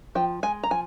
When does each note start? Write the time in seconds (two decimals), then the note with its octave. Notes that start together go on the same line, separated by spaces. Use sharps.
0.15 F3 G5
0.43 G#3 G#5
0.63 A#5
0.71 F3 G#5